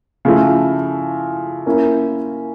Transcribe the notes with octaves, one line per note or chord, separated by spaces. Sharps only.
C#3 F3 A3 E4
A#3 C#4 E4 A#4